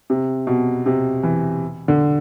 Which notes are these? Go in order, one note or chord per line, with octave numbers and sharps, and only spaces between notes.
C3
B2
C3
E3
D3